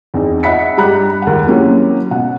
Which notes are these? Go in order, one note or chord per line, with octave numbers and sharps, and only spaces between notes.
E2 C4 D#4
D#5 E5 F#5 B5 B6 C#7
G2 G4 A#5 B5 F#6
D#2 F#5
F#3 A#3 C4 C#4 E4 G4
B2 F#5